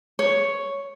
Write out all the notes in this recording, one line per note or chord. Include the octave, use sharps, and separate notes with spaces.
C#5